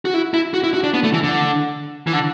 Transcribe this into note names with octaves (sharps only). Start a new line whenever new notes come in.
F#4
E4
E4
F#4
E4
F#4
D4
B3
A3
E3
D3
E3
D3